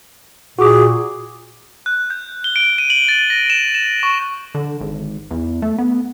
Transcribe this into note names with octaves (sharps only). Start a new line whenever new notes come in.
A#2 F#4 G#4 D6
F#6
G6
G7
D7
D#7
F#7
A6
A#6
E7
E7
C#6
D3
G#1
E2
A3
B3